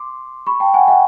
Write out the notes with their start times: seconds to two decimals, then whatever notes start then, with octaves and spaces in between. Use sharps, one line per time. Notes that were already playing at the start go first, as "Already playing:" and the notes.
Already playing: C6 D6
0.47 B5 C#6
0.60 G5 A5
0.74 F#5 G#5
0.88 E5 F#5